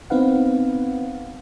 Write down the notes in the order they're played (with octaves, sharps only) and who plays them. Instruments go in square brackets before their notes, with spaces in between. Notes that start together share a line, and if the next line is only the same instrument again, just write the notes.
[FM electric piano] B3 C4 D#4 B4 F5 F#5